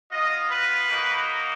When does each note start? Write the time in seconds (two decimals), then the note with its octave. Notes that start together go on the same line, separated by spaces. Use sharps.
0.11 B3 F4 D#5
0.50 B4
0.88 A#3 D#4 F#4